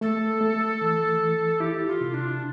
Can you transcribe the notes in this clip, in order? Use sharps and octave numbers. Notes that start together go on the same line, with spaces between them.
A3 A4
A3
E3
E3
E4 G4
F4
C3
D4